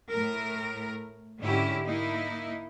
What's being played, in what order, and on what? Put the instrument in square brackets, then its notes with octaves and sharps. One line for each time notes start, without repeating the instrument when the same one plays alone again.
[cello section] A2 A3 A#4
G#2 D3 C#4 E4 G4
A#3 D#4 E4